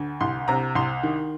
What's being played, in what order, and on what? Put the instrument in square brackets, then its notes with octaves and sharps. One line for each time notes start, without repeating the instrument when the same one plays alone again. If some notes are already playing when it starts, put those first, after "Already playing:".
Already playing: [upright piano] D2 D3
C2 C6
C3 A#5
C2 C6
D#3